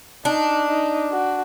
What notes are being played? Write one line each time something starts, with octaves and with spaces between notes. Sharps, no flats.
D4 D#4
D#4
F#4